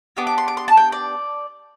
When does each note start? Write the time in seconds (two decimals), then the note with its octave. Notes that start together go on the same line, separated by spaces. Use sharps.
0.17 B3 D4 G4 D6
0.27 D6
0.38 C6
0.48 D6
0.57 C6
0.68 A5
0.77 G5
0.92 D5